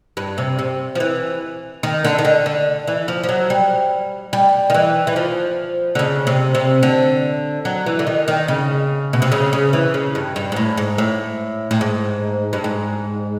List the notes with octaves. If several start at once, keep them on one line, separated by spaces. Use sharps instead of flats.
G2
C3
C3
F3
E3
D#3
D3
D#3
D3
D3
E3
F3
F3
F#3
G3
G3
D#3
E3
E3
F3
D3
C#3
C3
C3
D3
F#3
E3
D3
D#3
D#3
C#3
B2
C3
C#3
C#3
E3
C#3
G2
G2
G#2
A2
G#2
A2
A2
G#2
G2
G#2